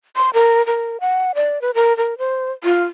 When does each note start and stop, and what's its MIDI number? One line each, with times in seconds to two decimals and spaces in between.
0.16 0.30 84
0.34 0.65 70
0.66 1.00 70
1.00 1.32 78
1.35 1.61 74
1.61 1.71 71
1.75 1.96 70
1.97 2.18 70
2.18 2.52 72
2.64 2.83 65